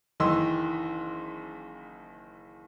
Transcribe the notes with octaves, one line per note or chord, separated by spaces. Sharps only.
F#1 D#3 E3 D#5 C6 E6